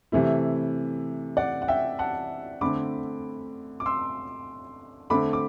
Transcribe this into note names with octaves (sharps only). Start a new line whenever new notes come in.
C3 E3 A3 E4
D5 F#5
F#5
E5 G5
F#5 A5
D3 A3 C4 B5 D6
D6
C6 E6
D3 A3 C4 B5 D6
D6